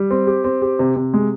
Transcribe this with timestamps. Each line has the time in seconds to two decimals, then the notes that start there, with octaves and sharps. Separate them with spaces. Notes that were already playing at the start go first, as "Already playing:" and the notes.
Already playing: G3
0.11 C4
0.27 G4
0.44 C4
0.62 G4
0.79 C3
0.96 C3
1.14 G#3